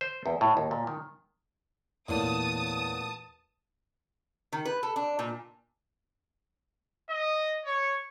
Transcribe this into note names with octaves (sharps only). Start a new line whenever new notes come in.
C5
E2
A2
D#2
A#2
D#3
A1 E2 A#2 A5 C6 D#6
D#3
B4
A4
D4
A#2
D#5
C#5